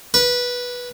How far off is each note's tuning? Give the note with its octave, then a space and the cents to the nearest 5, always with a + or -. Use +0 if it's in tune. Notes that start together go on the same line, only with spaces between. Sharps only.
B4 -15